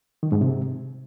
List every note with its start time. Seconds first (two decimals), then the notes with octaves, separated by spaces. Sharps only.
0.23 D#3
0.32 G#2
0.41 C3